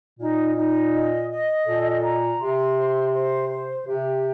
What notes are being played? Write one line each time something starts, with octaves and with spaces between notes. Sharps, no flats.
A#2 D#4
D#4
D#5
D#5
A#2 A4
A#5
C3 C6
C5
C5
C5
C3 G4